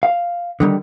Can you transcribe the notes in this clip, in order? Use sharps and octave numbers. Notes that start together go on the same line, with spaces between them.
F5
D3 D#3 G3